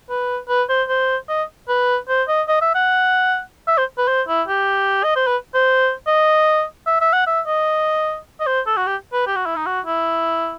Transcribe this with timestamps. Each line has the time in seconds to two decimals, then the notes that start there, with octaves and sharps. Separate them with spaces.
0.10 B4
0.49 B4
0.69 C5
0.89 C5
1.29 D#5
1.69 B4
2.09 C5
2.28 D#5
2.48 D#5
2.61 E5
2.75 F#5
3.68 E5
3.77 C5
3.98 B4
4.08 C5
4.28 E4
4.48 G4
5.04 D#5
5.16 C5
5.27 B4
5.54 C5
6.07 D#5
6.87 E5
7.01 E5
7.13 F#5
7.27 E5
7.47 D#5
8.40 D#5
8.46 C5
8.67 A4
8.77 F#4
8.87 G4
9.13 B4
9.27 G4
9.36 F#4
9.46 E4
9.56 D#4
9.66 F#4
9.86 E4